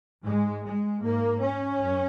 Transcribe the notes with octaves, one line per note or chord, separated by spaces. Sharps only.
G#2 G#3
G#3
G#2 A#3
C#4
F#2